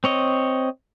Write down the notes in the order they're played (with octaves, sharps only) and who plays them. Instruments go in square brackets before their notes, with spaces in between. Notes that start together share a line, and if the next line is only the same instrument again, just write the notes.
[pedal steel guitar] C4 C#5 D#5